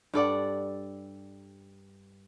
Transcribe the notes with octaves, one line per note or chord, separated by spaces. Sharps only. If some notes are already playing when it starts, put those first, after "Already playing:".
G2 A4 D5 F#5